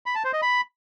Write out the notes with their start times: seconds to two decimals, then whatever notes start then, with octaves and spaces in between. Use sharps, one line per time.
0.06 B5
0.15 A5
0.24 C5
0.33 D#5
0.42 B5